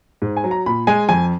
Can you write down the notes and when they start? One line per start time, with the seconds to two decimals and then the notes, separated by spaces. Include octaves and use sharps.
0.22 G#2
0.37 G#5
0.44 F#3
0.51 A#5
0.66 A#2 B5
0.87 G#3 G#5
1.09 F2 G#5